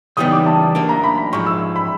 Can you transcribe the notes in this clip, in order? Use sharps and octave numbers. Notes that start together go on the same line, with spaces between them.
C#3 E3 G3 B3 D#4 D#6
D6
A5
F#3 A#3 D4
A#5
B5
B5
G#2 F3 G#3 C#6
E6
B5